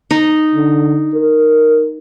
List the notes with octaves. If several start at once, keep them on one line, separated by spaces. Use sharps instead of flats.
D#4
D3
A#4